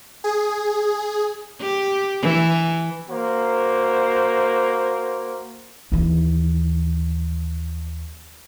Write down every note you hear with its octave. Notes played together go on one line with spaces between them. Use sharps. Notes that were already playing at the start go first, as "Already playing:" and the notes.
G#4
G4
E3
A#3 F#4 C5
D#2 E3